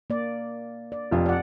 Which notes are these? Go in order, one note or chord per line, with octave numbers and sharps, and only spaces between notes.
A#3 D5
D5
F1 F2 F4
D5 F#5